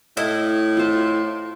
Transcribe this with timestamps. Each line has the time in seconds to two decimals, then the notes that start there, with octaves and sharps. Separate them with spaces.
0.17 A2 E4 D#5
0.77 F4 C5